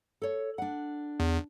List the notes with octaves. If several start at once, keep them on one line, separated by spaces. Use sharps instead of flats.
A4 C#5
D4 F#5
E2